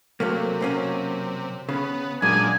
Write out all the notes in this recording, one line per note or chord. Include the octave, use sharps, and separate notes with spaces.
C3 F#3 A3 A#3
F#2 A#3 C#4
C#3 B3
F#2 A#2 G#3 D4 G#5